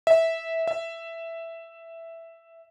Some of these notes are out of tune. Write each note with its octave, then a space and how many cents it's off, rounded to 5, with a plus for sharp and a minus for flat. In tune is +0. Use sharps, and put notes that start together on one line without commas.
E5 -10
E5 +5